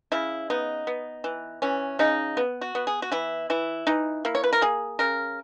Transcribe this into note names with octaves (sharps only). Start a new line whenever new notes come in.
C#3 E4
B3 D#4
B3
E3
E3 C#4
C#3 D#4
B3
F#4
B3
G#4
F#4
E3 E4
E3 E4
E3 D#4
A#3 E4
C#5
B4
A#4
A#3 G#4
C#3 A#4